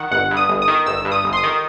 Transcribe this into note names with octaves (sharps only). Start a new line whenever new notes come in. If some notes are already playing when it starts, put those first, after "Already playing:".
Already playing: D#3 F#5
G1 F#5
G2
D#6
G1
D#6
D#3
G1 E6
G2
D#6
G1
C6
D#6
D#3